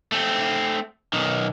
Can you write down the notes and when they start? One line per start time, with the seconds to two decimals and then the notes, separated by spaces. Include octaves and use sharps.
0.12 A3 C4
1.13 B1 D#3